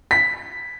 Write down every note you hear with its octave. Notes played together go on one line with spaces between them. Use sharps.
B6